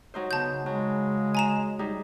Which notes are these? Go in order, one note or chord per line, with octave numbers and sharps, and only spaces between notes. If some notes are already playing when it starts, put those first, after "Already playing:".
F#3 D#4 C5
C#3 B3 A5 G6
F#3 G#3
G#5 A#5 E7
G3 D#4 G#4